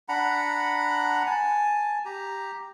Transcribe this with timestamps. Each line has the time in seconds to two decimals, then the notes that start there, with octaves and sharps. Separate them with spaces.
0.09 D4 F#5 A#5 B5
1.26 G#5 A5
2.05 G4 A#5